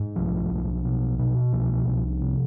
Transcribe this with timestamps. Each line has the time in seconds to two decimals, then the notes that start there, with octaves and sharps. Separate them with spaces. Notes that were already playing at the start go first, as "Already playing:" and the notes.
Already playing: G#2
0.16 B1 F3
0.50 B1
0.85 B2
1.19 B2
1.53 C2 F3
1.87 C2
2.21 C3